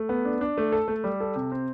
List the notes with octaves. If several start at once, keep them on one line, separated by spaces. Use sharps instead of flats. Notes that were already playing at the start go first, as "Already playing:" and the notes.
Already playing: A3
B3
D4
D4
A3
A4
A3
G3
A4
C3
C4